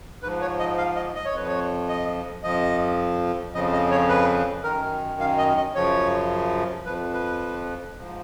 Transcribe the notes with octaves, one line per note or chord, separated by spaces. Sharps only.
G#2 F3 B4
C#5
D#5
F5
D#5
D#5
C#5
F2 F3 B4
C#5
D#5
F2 F3 D#5
F2 C#3 F3 D#5
D#5
C#5
B4
F#2 D#3 A#4
F5
D#5
D#5
F#2 C#3 F3 C#5
F2 F3 B4
B4
G#2 F3